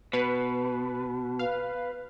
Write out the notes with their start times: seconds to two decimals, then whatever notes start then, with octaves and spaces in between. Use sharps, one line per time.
0.13 B2 B4
1.39 B4 F5